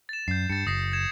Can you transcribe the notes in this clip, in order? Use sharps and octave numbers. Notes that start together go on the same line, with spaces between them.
A6 E7
F#2 G6 C7
G2 A6 C#7
F#1 D#6 A#6 C7
G#6 E7